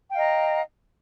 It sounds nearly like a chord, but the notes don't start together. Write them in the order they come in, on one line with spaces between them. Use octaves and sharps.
G5 F5 D#5 A#5